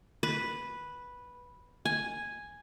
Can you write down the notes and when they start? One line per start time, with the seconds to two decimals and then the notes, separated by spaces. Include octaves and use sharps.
0.23 B4
1.85 G#5